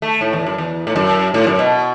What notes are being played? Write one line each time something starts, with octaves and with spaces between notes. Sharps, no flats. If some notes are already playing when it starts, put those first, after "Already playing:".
A3
A2
E2
F#2
E2
A2
F#2
A2
F#2
B2